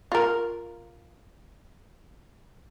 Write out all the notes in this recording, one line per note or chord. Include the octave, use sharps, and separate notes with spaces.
F4 A#4